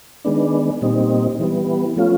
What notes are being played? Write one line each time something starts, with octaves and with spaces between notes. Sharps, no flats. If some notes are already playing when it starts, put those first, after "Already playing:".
D#3 G#3 B3 D4
A#2 G3 C4 D#4
E3 G3 B3
F3 A3 C#4 F4